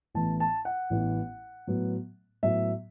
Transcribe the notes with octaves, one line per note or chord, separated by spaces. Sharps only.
A1 A2 E3 B3 A5
A5
F#5
A1 A2 E3 B3
A2 F#3 B3
A2 F#3 B3 E5